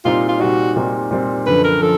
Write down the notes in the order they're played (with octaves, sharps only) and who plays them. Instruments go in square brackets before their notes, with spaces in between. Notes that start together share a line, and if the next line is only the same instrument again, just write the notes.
[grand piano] A#2 G3 C4 D#4 [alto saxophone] F4
[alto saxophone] F4
[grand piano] A#2 G3 C4 D#4 [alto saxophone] F#4
[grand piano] A#2 G3 C4 D#4
A#2 G3 C4 D#4
[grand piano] F#2 D3 F3 [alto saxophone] B4
[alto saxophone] A#4
[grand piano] F3 [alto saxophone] A4